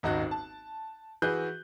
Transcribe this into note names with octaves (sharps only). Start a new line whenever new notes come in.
D#1 G#1 D#4 F#4 F#6
A5
E3 F#4 G#4 B4 F#6 G6